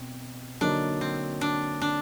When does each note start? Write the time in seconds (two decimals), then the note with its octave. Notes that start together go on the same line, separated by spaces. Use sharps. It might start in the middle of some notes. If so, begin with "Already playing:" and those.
Already playing: B2 C4
0.61 D3 F#3 A#3 D4 D#4
1.01 C4
1.41 D4
1.82 D4